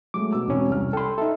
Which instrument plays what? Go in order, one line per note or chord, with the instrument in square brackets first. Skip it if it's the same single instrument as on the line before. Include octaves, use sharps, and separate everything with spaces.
[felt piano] F#3 G#3 A3 [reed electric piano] D6
[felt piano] B2 E6
[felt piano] E1 C4 [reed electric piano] E2 C#4
[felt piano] C2 F6
[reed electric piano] A4 C6 [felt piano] G5 B5
[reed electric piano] D#4 A4 [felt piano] E5